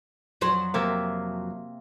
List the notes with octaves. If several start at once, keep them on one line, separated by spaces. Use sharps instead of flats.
F2 F#3 C5
C3 A#3 E5